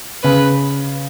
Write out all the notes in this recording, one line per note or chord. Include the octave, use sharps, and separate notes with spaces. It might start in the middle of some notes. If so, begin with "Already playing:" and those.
C#3 B4